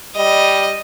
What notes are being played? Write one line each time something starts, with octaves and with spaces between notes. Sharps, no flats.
G3 D#5